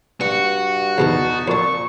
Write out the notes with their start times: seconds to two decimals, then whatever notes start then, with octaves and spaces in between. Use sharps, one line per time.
0.21 G2 F#4 C#6
0.98 E2 B2 D#3 B3 D#4 A5
1.48 F2 A#2 D4 C#6